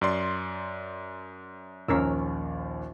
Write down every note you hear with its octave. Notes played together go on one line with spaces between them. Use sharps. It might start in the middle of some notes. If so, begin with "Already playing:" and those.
F#2 D5 C6
A#1 D#2 C#4 A#4 E6